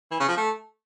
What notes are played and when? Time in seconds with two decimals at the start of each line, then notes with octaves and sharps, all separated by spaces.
0.11 E3
0.20 C#3
0.28 F3
0.37 A3